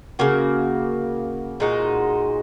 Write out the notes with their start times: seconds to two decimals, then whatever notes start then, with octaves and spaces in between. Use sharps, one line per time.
0.19 C#3 A#3 F#4
1.60 A#2 G#3 D#4 F#4